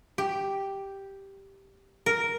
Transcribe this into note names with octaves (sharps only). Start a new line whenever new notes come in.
G4
A#4